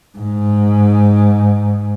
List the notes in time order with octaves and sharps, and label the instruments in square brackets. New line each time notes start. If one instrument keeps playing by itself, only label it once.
[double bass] G#2